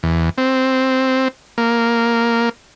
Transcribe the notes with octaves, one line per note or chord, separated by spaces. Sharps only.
E2
C4
A#3